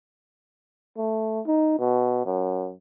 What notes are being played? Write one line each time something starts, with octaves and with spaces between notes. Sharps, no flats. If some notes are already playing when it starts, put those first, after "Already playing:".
A3
D#4
B2
F#2